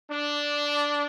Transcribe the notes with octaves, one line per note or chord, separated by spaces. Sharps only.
D4